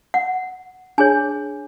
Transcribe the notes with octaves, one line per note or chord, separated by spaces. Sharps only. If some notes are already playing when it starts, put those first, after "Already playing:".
F#5
D4 G#4 C#5 G#5